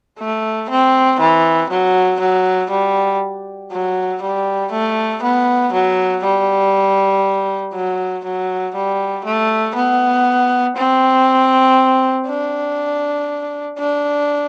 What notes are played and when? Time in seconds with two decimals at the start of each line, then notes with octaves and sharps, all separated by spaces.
0.19 A3
0.69 C4
1.20 E3
1.70 F#3
2.20 F#3
2.71 G3
3.71 F#3
4.22 G3
4.72 A3
5.23 B3
5.73 F#3
6.24 G3
7.74 F#3
8.25 F#3
8.75 G3
9.25 A3
9.75 B3
10.77 C4
12.28 D4
13.79 D4